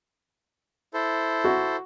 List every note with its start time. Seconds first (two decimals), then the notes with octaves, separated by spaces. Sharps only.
0.94 E4 A4 C5
1.44 F#4